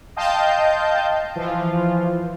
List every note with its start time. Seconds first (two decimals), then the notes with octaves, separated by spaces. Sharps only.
0.16 D#5 F5 G5 A5 C6 G6
1.36 E3 F3 F4